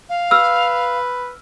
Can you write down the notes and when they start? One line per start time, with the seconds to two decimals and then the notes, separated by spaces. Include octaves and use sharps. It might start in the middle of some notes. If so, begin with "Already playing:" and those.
0.09 F5
0.31 B4 E6 F6